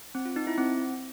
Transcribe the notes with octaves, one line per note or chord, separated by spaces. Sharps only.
C4
F4
D#4
E4
C4